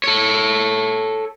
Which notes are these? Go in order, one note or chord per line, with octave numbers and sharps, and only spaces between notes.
A4 C#5